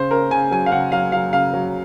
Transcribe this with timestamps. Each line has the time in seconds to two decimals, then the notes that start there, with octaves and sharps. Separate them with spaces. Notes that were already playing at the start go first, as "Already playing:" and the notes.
Already playing: C#3 C5
0.11 C#3 A#4
0.31 C#3 G#5
0.51 F#3 G#5
0.66 F5
0.72 C#3 F#5
0.92 F#3 F5
1.12 F#3 F5
1.32 C#3 F5
1.53 F#3